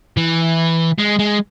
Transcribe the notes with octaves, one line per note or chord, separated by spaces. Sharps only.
E3
G#3
G#3